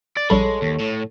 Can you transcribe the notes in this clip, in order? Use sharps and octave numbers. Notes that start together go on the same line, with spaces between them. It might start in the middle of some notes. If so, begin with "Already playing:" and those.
D5 A6
A#1 G3 G#3 A4 C#5 B5
D#2
A2